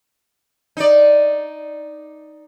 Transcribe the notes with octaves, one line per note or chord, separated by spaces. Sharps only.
D#4 D5